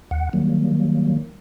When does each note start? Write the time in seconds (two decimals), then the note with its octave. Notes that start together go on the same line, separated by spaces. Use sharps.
0.11 D#2 F#5
0.33 D#3 F#3 G3 A#3